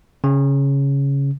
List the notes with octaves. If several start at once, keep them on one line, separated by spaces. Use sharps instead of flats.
C#3